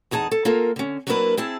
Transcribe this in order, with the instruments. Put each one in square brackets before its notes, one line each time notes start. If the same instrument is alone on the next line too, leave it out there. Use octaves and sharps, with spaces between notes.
[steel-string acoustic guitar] E2 D#4 G#4 G#5 A5
A4
A#3 F4 A4 A#4
D3 C#4
F#3 A#3 D4 E4 A#4 B4
C4 E4 G#4 A5